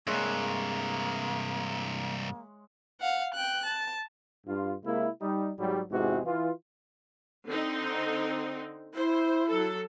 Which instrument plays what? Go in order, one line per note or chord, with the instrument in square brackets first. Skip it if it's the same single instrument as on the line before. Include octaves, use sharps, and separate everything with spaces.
[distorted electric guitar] G2 C3 [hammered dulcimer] G#3 C#5 E5 [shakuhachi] A#3
[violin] F5 F#5
G5 F#6
A5
[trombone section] G2 F4
C3 G#3 A#3 E4
G3 D#4
G#1 F#3 G3
E2 G#2 C3 E3 G#3 F#4
E3 F4
[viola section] D3 C4 D#4
[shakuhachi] E4 [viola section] C5
[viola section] F#3 A4